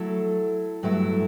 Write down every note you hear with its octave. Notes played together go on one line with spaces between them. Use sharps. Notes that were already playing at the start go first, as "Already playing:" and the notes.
Already playing: F#3 A3 E4 A4
G2 F#3 A3 E4